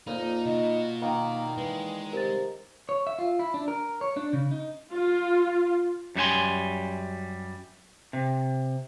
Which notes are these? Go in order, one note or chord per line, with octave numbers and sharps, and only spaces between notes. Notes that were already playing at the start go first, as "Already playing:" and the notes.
F2 A#2 D#4
B2 D#4 F#4
D#3 A#3
E3 G#3
C3 A#4 A6
C#5
E5
F4
E4
D4
A#4
C#5
D4
C#3
D#4
F4
F#2 G3 D4 G#5 C6
C3